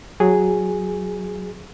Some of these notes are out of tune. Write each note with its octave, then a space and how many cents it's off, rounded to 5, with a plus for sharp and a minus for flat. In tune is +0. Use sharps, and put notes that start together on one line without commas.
F#3 +0 G#4 -5